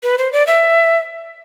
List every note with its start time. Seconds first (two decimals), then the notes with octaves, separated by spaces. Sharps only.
0.03 B4
0.18 C5
0.33 D5
0.47 E5